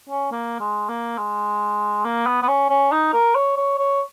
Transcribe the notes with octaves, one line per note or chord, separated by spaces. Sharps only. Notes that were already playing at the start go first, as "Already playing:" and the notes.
C#4
A#3
G#3
A#3
G#3
A#3
B3
B3
C#4
C#4
D#4
A#4
C#5
C#5
C#5